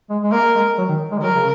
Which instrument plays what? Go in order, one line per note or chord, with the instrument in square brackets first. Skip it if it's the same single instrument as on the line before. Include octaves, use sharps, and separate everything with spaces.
[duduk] G#3
G#3
[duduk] A#3 [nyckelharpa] A#4
[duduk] G#3
F#3
D#3
G#3
D#3
[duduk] F#3 [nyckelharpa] A#4
[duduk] C#3